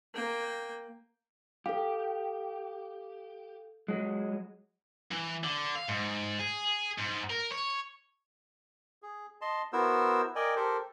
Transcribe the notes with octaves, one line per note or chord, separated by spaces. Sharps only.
A#3 G5
G4 A4 F5
F#3 G#3
E3
D3
F5
G#2
G#4
G#2
A#4
C#5
G#4
D#5 A5 C6
B3 E4 F#4 A#4 C5 E6
A#4 D5 D#5 G5 G#5
G4 A4 A#4 C5